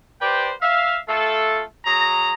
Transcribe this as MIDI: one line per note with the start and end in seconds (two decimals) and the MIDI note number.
0.21 0.50 67
0.21 0.50 71
0.21 0.50 72
0.21 0.50 74
0.21 0.50 79
0.62 0.96 76
0.62 0.96 77
1.08 1.61 57
1.08 1.61 65
1.08 1.61 69
1.85 2.32 54
1.85 2.32 68
1.85 2.32 82